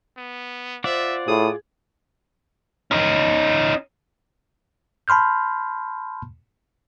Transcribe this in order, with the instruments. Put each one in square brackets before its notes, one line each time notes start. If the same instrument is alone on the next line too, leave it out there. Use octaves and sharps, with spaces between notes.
[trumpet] B3
[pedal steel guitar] F4 D5 F#5 [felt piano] C5 [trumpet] E5
[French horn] A2 [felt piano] G#4 [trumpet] D#6
[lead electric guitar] C#4 D#4
[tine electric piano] A5 B5 C6 F6 G6